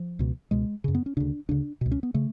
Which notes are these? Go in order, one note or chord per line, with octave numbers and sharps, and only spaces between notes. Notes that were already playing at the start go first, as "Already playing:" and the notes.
Already playing: F3
C#2 B2
C#2 B2 G#3
F#2 C#3
B3
C#4
D2 C#3 D4
D2 C#3 D4
C#2 B2
C#4
B3
C#3 A3